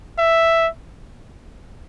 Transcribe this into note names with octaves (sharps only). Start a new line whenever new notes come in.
E5